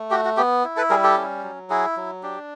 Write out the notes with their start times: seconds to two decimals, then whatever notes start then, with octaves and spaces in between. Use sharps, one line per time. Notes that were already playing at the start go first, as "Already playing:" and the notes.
Already playing: A3
0.11 F#4 G4
0.25 F#4
0.37 B3 G4
0.65 E4
0.77 A4 B4
0.90 G3 G#4 A#4
1.03 G4 A4
1.17 C#4
1.43 F#3
1.70 E4 F#4 G#4
1.97 F#3
2.23 D4 G4